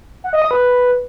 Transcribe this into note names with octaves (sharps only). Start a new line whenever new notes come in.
F#5
D#5
D#6
B4